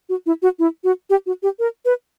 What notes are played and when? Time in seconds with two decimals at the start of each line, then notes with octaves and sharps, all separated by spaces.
0.09 F#4
0.26 E4
0.42 F#4
0.59 E4
0.84 F#4
1.10 G4
1.26 F#4
1.43 G4
1.59 A#4
1.85 B4